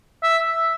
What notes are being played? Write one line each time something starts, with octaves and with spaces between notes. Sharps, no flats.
E5